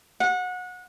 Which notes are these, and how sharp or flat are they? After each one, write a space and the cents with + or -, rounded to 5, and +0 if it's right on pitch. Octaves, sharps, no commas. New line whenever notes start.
F#5 -25